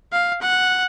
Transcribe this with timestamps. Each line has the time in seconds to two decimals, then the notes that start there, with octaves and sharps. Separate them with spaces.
0.13 F5
0.42 F#5